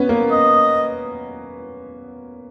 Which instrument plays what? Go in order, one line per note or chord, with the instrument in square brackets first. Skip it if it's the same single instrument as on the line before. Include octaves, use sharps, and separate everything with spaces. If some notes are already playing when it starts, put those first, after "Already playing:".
Already playing: [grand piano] B3 C#4
A#3
[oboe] D#5